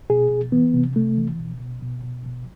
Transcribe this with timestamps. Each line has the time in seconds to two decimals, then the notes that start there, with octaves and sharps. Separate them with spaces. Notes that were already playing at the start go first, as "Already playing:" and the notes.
0.10 B2 G#4
0.31 B2
0.52 E3 B3
0.74 C3
0.96 C3 A3
1.17 E3
1.39 B2
1.61 B2
1.82 B2
2.04 B2
2.26 B2